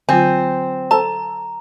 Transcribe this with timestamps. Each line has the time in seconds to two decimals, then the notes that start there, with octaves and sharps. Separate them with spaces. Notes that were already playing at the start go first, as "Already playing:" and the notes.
0.09 D3 F#3 C4 F4 G#5
0.91 A4 C5 A5 A#5 E6